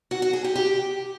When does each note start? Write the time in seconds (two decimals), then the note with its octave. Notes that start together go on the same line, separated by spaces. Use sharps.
0.11 F#4
0.22 F#4
0.33 G#4
0.44 G4
0.56 G4